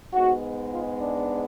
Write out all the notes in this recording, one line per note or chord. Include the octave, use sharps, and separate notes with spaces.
G#2 G#3 B3 F#4
F4
D4